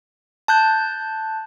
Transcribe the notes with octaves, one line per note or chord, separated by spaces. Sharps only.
A5 F#6 G6